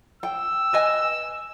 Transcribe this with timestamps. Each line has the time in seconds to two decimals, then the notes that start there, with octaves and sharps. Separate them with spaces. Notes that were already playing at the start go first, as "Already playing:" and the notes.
0.23 G5 E6
0.73 B4 D#5 G#5